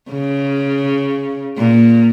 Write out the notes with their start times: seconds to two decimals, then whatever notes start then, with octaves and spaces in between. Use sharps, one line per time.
0.11 C#3
1.57 A#2